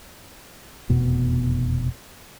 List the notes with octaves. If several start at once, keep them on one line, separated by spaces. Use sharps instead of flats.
F1 E2 B2 B3